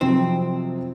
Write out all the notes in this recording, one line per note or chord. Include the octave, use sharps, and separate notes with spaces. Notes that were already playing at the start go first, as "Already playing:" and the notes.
F2 C3 F#3 C4